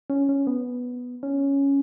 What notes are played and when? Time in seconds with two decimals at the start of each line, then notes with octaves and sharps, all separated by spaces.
0.10 C#4
0.29 C#4
0.47 B3
1.23 C#4